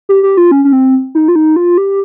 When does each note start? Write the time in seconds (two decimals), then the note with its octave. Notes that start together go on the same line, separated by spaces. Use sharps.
0.09 G4
0.23 G4
0.37 F4
0.51 C#4
0.65 C#4
0.72 C4
1.15 D#4
1.28 F4
1.36 D#4
1.56 F4
1.78 G4